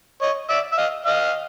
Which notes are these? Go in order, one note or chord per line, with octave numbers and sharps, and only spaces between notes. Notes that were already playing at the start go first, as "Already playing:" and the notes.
C#5 D#5
D5 E5
E5
D#5 F5
D#5 F5